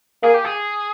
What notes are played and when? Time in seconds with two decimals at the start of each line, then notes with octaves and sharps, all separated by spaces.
0.23 A#3 G#4
0.34 G4
0.45 G#4